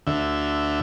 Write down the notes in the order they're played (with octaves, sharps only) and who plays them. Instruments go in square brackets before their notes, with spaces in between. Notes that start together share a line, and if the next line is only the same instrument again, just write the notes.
[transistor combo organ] D2 D3 E5